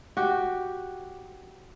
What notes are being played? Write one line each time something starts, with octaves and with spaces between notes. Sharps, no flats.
F#4 G4